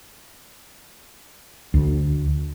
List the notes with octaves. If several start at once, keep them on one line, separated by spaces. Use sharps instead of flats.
D2